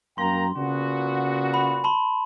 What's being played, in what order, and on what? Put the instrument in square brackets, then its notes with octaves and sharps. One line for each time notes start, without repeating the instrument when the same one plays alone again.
[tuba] F#2 [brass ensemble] A#3 G5 A#5 [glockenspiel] C6
[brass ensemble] A#2 B3 F#4 [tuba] C#3
[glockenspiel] B5
A5 B5 C6